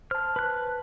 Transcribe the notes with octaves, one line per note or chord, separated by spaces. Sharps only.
C5 A5 F6
B4 F#6